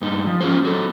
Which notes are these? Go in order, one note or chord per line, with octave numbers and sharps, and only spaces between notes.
G2 D#4
F3
C#4 F4 F#4 G#4 C5
F#3 A4